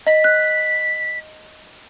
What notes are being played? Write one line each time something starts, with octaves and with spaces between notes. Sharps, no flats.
D#5 B6
F#6